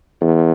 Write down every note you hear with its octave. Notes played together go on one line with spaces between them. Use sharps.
E2